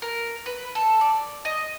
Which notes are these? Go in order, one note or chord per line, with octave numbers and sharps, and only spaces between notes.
A#4
B4
A4
D5
D#5